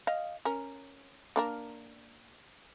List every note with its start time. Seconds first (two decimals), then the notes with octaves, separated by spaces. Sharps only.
0.07 D#5 F5
0.45 C#4 A#4
1.36 A#3 D4 A#4